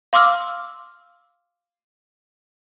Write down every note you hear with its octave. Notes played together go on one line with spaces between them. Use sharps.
F5 C6 D6 E6 F6